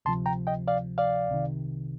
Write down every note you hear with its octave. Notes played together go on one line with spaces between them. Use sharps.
D2 C3 F3 A5 C6
G5 A#5
D#5 G5
D5 F5
D5 F5
C2 C3 D#3